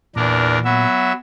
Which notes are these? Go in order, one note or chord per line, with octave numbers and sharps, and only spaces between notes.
E2 A#2 D4 A#4
F#3 B3 E5